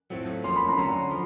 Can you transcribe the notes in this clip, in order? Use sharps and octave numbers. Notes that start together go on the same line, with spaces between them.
A2 F#3 A3 C4 F4
F3 A#3 C#4 C6
B5
A#5 C6
D3 F#3 A3 C#4
F3